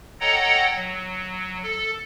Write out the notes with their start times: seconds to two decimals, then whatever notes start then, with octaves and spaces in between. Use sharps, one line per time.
0.20 A4 C#5 D#5 F#5 G5 A#5
0.75 F#3
1.63 A4